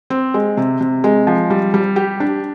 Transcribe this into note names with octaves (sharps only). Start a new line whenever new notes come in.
C4
G#3
C3
C3
G#3
F3
G3
G3
G4
D4